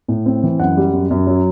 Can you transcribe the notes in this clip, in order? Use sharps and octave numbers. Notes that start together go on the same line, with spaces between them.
A2
C4
E3
F#2 F#5
G3
F#2
F#2
F#3